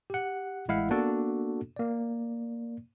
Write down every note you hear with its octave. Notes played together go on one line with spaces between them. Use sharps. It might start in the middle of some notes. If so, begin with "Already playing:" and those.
G4 F#5
A1 G#3 E4 D#5 F5 F#5
A#3 B3 D4 F#4 A4
A#3 D5